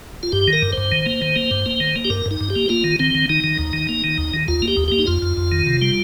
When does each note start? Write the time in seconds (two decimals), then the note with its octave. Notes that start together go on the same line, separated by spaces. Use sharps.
0.23 F4
0.32 G2 G4
0.48 D#3
0.53 A#4
0.62 G2
0.73 G2 C5
0.92 D#3
1.06 A#3
1.22 D#3
1.36 A#3
1.51 G2
1.66 A#3
1.80 D#3
1.96 A#3
2.05 G4
2.10 G2 A#4
2.26 G2 D#4
2.41 G2
2.50 G4
2.56 A#3
2.69 A#3 F4
2.84 D#3
3.00 D#3 C4
3.15 D#3
3.29 D#3 D#4
3.44 D#3
3.59 D#2
3.73 D#3
3.89 A#3
4.04 D#3
4.18 D#2
4.34 D#3
4.48 D#2 F4
4.62 A#3
4.68 G4
4.77 D#2
4.88 A#3 G4
4.99 D#4
5.07 F2 F4
5.22 F2
5.37 F2
5.52 D#3
5.66 C3
5.82 G3